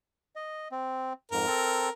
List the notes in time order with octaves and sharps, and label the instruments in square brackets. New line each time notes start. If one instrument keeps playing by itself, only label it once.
[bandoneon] D#5
C4
[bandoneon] F2 G#2 [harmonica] A#4
[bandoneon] C4 A4